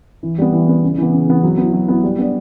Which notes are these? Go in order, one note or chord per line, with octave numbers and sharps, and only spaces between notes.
E3
G3 B3
E3
G3 B3
C#3
E3 B3
C#3
E3 B3
F#3
B3 E4
F#3
B3 E4
G3
B3 D4